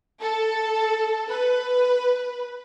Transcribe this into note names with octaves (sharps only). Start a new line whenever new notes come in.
A4
B4